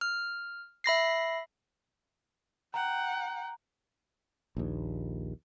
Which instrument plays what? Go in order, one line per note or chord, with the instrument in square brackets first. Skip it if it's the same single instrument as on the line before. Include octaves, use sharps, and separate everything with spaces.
[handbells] F6
E5 B5 A#6 C7
[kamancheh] F#5 G5 [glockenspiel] A#5
[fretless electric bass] A#1 D#2